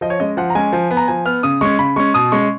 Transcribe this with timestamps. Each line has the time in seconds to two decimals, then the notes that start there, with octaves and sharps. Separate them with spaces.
0.01 F3 D#5
0.10 C#5
0.19 G#3 C#4 D#5
0.37 F3 F#5
0.50 A#5
0.55 G#3 C#4 G#5
0.73 F3
0.91 B3
0.97 A#5
1.08 F3 G#5
1.25 B3 F6
1.43 C#3 D#6
1.61 G#3 C#4 C#6
1.79 C#3 B5
1.96 G#3 C#4 C#6
2.14 B2 D#6
2.32 G#3 C#4 C#6